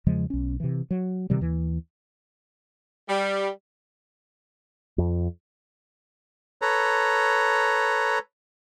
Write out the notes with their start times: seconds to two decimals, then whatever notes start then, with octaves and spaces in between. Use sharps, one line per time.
0.06 E2 C#3 F3 G#3
0.30 B1 C#4
0.60 C3 E3
0.91 F#3
1.30 C3 D#3 G3
1.41 D#2 E3
3.09 G3
4.98 F2
6.62 A4 B4 C#5 A#5